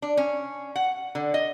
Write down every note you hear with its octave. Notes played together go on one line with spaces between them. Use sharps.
D4
C#4
F#5
D3
D#5